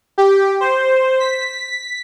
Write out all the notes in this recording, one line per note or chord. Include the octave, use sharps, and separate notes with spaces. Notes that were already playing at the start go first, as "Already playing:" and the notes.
G4
C5
B6